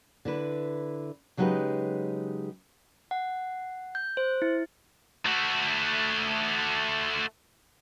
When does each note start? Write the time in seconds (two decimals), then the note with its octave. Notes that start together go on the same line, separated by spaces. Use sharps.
0.25 D3 E4 B4
1.37 C#3 F#3 G#3 D#4 G4 B4
3.11 F#5
3.95 G6
4.17 C5
4.42 E4
5.26 A3 F#4